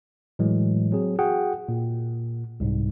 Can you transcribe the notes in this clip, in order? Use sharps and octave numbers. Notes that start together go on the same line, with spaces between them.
A2 E3 F#3 G#3
F#3 C4 G#4
F#4 G#4 F#5 G5
A#2
C2 G#2